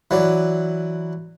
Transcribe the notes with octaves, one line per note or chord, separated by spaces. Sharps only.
E3 F#3 D5